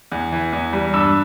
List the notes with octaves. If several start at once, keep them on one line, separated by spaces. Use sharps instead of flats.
E2
E3
E2
G3
G2 E6